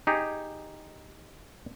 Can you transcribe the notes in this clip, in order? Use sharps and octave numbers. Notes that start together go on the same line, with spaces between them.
D#4 G4 G#4